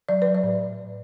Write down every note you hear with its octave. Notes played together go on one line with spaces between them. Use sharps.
F#3 D5
B4
F#3
D5
A2